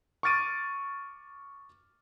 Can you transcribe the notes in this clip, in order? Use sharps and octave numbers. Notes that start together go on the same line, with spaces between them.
C#6 D6 F6 A6 D7 D#7